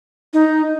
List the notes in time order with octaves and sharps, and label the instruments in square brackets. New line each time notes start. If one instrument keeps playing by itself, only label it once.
[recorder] D#4